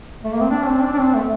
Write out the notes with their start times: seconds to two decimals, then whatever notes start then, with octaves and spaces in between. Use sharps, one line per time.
0.24 A3
0.33 A#3
0.42 C4
0.51 D4
0.66 C4
0.82 D4
0.93 D4
0.99 C4
1.15 A3